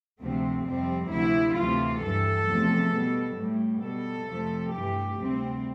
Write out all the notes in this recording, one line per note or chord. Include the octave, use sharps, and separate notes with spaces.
D2 C3 F3 A3 C4
F2 C3 G3 C4
D2 C3 F3 E4
D2 C3 E3 A3 F4
G2 E3 G3 A4
E2 C3 F3 A3
B2 G3
A2 G3
B2 G3 A4
F2 C3 F3 A3
G2 E3 A3 G4
D2 C3 G3 C4